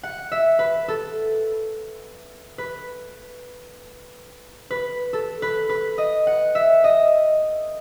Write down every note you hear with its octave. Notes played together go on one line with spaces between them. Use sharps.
F#5
E5
B4
A4
B4
B4
A4
B4
B4
D#5
F#5
E5
D#5